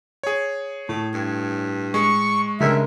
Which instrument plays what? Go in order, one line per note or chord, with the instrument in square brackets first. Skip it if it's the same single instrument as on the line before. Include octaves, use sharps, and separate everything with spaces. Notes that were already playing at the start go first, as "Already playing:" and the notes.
[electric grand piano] G#4 C#5
[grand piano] A2 [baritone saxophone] A3
[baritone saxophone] G2
[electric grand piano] G#3 [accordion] C#6
[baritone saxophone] G2 [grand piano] C#3 G#3 A#4 [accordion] E5